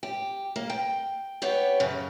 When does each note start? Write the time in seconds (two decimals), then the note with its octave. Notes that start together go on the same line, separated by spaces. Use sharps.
0.03 G4
0.56 A#3
0.70 G5
1.42 B3 G4 C#5
1.80 F#2 C#3